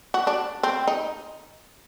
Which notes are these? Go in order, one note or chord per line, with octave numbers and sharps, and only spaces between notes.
F#4
D4
C4
D#4